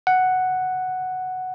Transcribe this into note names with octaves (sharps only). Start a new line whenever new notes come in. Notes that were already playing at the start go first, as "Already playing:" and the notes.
F#5